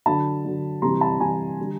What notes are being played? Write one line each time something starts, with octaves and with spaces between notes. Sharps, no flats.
D3 F#3 A5 B5
D3 F#3
C3 E3 G3 A#5 C6
A5 B5
C3 E3 G3 G#5 A#5
D3 G3